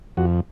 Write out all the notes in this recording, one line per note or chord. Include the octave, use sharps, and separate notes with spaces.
F2 F#4